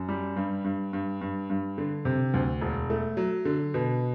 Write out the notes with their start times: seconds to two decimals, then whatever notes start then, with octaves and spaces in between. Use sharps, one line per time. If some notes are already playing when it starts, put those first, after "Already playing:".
Already playing: F#2
0.09 G3
0.36 G2
0.64 G2
0.93 G2
1.21 G2
1.50 G2
1.78 D3
2.05 C3
2.34 D2
2.61 E1
2.90 A3
3.17 F#3
3.45 D3
3.74 B2